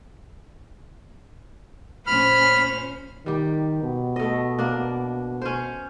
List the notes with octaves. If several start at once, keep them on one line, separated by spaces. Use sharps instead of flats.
A#2 C#4 C5 B5 F6
D#3 G3 G4
B2
A3 D#5
A#3 D4
C#4 C5